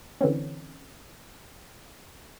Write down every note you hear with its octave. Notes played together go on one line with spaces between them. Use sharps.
D3 E3 C4 C#4